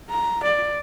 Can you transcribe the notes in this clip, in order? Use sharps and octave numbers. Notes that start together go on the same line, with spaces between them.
A#5
D5